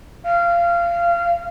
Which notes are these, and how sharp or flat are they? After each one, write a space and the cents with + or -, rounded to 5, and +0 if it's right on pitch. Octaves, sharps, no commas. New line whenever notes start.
F5 -20